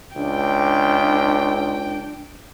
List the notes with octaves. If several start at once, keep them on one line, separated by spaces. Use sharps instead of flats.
C#2 D4 G5